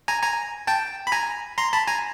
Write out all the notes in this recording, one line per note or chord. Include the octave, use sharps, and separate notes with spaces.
G#5 A#5
G#5 A#5
G5 A5
B5
G#5 A#5
A#5 C6
A5 B5
G#5 A#5